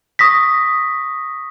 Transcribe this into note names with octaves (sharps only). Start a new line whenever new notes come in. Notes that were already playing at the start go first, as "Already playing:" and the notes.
C#6 D#6 A#6 B6